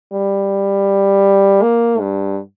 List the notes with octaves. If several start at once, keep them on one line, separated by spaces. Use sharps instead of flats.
G3
A#3
G2